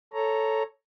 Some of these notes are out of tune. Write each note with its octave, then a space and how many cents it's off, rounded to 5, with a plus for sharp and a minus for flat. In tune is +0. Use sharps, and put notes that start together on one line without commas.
A4 +0 C#5 +0 A#5 +0